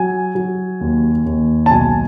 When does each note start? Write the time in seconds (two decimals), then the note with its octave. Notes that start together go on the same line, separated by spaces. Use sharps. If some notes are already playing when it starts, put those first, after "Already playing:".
Already playing: F#3 G#5
0.35 F#3
0.81 D#2
1.26 D#2
1.66 A5
1.71 B1 G#5